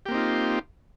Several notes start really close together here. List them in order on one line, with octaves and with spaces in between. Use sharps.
G4 A#3 C4 D#4 F4